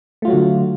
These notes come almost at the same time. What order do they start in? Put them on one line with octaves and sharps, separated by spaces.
A3 F4 F#3 F#4 D3